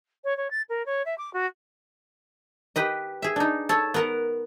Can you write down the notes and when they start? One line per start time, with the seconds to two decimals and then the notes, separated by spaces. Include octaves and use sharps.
0.24 C#5
0.37 C#5
0.51 A6
0.69 A#4
0.86 C#5
1.05 E5
1.18 D6
1.33 F#4
2.76 G4 B4 D#5
3.22 G#4 E5
3.36 D4 D#4
3.69 A4 C#5
3.94 B3 A#4 F#5